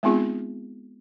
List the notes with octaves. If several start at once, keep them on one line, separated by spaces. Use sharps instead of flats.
G#3 B3 C4 D#4 F4 G#4